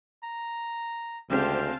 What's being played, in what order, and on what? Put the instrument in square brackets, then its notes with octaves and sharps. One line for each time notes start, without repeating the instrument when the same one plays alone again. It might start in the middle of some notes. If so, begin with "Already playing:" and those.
[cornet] A#5
[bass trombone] D2 [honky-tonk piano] C#3 G#3 C4 [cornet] G4 [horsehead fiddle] F5 A5